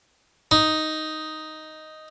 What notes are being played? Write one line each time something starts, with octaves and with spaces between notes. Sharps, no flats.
D#4